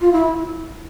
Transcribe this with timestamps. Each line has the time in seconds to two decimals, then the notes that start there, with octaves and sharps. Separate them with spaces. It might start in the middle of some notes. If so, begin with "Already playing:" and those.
0.01 F4
0.12 E4